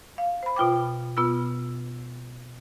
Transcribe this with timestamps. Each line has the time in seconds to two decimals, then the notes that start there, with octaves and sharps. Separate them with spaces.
0.18 F5
0.43 C5 B5
0.56 B2 F4 G5 D6
1.17 B2 B3 F4 E6